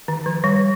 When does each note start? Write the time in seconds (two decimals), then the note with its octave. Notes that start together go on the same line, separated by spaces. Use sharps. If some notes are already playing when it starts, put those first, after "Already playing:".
0.08 D#3
0.26 F3
0.44 G3